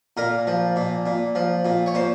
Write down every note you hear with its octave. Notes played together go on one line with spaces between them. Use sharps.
A#2 A#4
F3
A#2
A#2
F3
A#2
C#5
A#2 C5